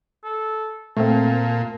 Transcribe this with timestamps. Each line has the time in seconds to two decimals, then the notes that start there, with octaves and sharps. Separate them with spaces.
0.24 A4
0.97 A#2 A3 C4 A5